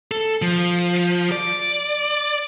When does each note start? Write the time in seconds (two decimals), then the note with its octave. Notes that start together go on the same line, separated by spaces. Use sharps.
0.11 A4
0.42 F3
1.32 D5